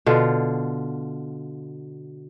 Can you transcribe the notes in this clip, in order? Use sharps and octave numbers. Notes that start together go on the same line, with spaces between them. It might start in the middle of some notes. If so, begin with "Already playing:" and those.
B2 D3 F4